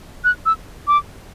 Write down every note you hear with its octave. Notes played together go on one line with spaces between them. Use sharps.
F#6
E6
D6